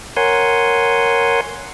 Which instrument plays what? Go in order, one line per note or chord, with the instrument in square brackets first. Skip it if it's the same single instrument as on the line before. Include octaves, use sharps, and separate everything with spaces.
[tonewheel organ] A#4 C#5 F#5 G#5 C6